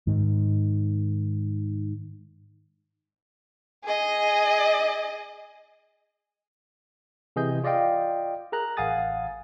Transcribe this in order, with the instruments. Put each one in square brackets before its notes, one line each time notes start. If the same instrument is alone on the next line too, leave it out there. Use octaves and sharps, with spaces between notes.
[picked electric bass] G#2 D#3
[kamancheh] G#4 D#5
[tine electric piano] C3 E3 G#4 D#5 G6
F4 D5 D#5 F5 G5
G#4 A#4 A#5 F#6
A1 F5 F#5 G#5 D#6 A6